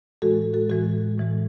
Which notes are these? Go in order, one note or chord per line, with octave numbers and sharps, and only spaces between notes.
A2 E3 G#3 F#4 A4
F#4 A4
A2 E3 G#3 F#4 A4
A2 E3 G#3